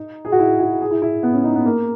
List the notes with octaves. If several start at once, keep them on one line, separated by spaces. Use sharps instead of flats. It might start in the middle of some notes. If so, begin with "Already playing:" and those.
Already playing: D#4
G#4
F#4
E4
F#4
G#4
E4
E4
B3
C#4
D#4
B3
A#3